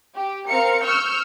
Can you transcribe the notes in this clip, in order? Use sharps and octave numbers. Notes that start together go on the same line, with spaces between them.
G4
C4 A#4 F5 C#7
C#6 E6 F6 G6